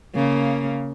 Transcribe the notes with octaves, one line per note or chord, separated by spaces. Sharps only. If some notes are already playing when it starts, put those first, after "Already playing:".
C#3 A#3